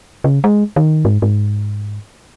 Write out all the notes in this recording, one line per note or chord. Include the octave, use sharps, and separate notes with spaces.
C#3
G#3
D#3
G#2
G#2